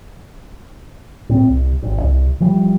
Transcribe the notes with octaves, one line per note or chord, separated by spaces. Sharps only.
A2 C4
C2
G#1
C2
E3 F3 G3